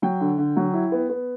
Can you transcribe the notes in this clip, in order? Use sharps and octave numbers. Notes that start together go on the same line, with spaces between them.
F#3 G5
D3
D3
F#3
E4
B3
B3